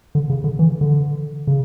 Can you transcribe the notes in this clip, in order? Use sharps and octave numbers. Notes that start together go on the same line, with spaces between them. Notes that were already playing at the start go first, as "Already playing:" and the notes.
D3
C#3
D3
E3
D3
C#3